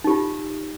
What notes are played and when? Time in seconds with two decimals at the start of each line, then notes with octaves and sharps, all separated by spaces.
0.04 D#4
0.07 G4
0.10 F4